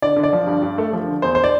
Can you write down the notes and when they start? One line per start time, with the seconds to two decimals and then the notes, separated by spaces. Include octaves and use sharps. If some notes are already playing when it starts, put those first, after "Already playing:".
0.02 D3 D5
0.16 D3
0.23 D5
0.33 F3
0.47 G2
0.62 G2
0.78 A3
0.93 F3
1.07 D3
1.22 E2 C5
1.35 C5
1.44 D5